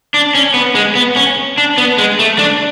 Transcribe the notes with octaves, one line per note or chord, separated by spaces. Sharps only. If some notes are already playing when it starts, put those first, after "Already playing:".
D4
C#4
B3
G#3
B3
C#4
D4
B3
G#3
A3
D4